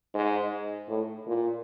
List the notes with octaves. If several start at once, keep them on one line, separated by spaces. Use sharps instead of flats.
G#2
A2
A#2